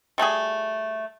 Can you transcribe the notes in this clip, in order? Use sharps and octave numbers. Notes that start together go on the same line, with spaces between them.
G3 A3 F#4 G#4